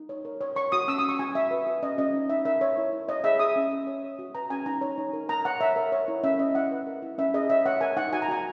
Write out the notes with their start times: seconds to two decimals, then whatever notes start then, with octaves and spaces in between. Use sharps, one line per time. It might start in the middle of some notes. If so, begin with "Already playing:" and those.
Already playing: D#4
0.09 C#5
0.25 A#4
0.41 C#5
0.56 C#5 C#6
0.72 F#4 D#6
0.88 C#4 E6
0.99 F#4 D#6
1.09 C#6
1.19 F#4 G#5
1.35 F#4 E5
1.51 B4
1.67 F#4
1.83 C#4 D#5
1.98 C#4 D#5
2.14 D#4
2.29 D#4 E5
2.45 A#4 E5
2.61 C#5
2.77 E4
2.93 E4
3.08 C#5 D#5
3.24 G#4 E5
3.39 G#4 D#6
3.56 C#4
3.71 C#5
3.87 C#5
4.03 C#5
4.19 F#4
4.34 B4 A#5
4.50 C#4 G#5
4.66 D#4 A#5
4.81 C#5
4.98 D#4
5.13 A#4
5.29 A#4 A#5
5.45 C#5 F#5
5.60 C#5 E5
5.76 A#4
5.92 C#5
6.08 E4
6.23 C#4 E5
6.39 C#4 D#5
6.55 E4 F#5
6.71 B4
6.87 A#4
7.02 E4
7.18 C#4 E5
7.34 G#4 D#5
7.50 C#5 E5
7.66 C#5 F#5
7.81 A#4 G#5
7.97 D#4 F#5
8.12 F#4 G#5
8.22 A#5
8.28 F#4 G#5